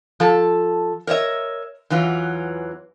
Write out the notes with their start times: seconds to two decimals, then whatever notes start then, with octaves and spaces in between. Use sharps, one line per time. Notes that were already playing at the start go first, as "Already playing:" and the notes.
0.20 F3 A4 A5
1.07 A#4 C#5 D#5 E5
1.90 E2 E3 F#3 F4